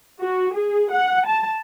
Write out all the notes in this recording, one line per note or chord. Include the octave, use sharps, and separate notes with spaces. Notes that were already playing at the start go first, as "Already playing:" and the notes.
F#4
G#4
F#5
A5